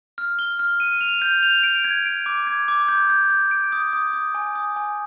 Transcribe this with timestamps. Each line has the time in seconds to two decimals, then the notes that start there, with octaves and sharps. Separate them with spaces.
0.18 F6
0.39 G7
0.59 F6
0.80 D#7
1.01 F7
1.22 G6
1.43 F7
1.63 D7
1.85 G#6
2.06 D7
2.26 D6
2.47 G#6
2.68 D6
2.88 G6
3.10 G6
3.30 G6
3.51 D7
3.72 D#6
3.93 D#6
4.13 D#6
4.34 G#5
4.55 D#6
4.76 G#5